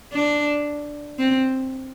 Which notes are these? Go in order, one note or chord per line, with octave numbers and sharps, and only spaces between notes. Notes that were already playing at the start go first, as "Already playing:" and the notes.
D4
C4